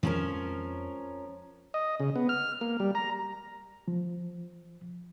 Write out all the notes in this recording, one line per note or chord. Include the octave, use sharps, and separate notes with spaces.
F2 F3 G#3 C#4 A#4
D#5
C#3
B3
F6
A#3
G3
A#5
F3